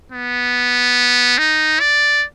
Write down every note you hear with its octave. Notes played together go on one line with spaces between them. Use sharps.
B3
D#4
D5